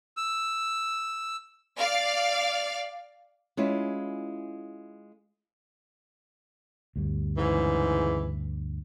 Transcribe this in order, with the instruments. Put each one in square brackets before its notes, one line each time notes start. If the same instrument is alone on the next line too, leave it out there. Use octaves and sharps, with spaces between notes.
[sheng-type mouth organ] E6
[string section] D5 F5
[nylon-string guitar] G#3 C#4 E4 F4
[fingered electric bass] D2 G2
[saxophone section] G#2 C#3 E3